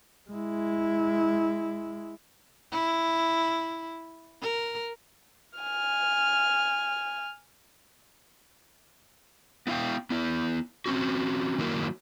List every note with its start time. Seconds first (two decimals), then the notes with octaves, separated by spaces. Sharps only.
0.30 G#3 E4
2.72 E4
4.42 A#4
5.59 G#5 F6
9.67 B3 E4 F5 G5
10.10 B3 E4
10.86 C4 C#4 F#4
11.58 D#3 F#3 A#3 E4 A#4